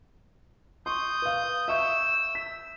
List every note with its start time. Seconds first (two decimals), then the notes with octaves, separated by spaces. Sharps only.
0.86 C6 C#6 D#6 G6
1.22 B4 F5
1.68 E5 C#6 E6 G6
2.35 B6